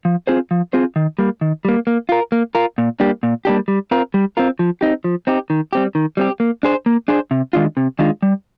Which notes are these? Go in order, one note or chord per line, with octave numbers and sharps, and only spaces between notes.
F3
C4 F4 G#4 C5
F3
C4 F4 G#4 C5
D#3
G3 A#3
D#3
G3 A#3
A#3
F4 A#4
A#3
F4 A#4
A#2
G3 A#3 D4 G4
A#2
G3 A#3 D4 G4
G3
C4 F4 A#4
G3
C4 F4 A#4
F3
C4 D#4 G4
F3
C4 D#4 G4
D#3
G3 C4 G4
D#3
G3 C4 G4
A#3
D4 G#4 C5
A#3
D4 G#4 C5
C3
D#3 G#3 D4 F4
C3
D#3 G#3 D4 F4
G3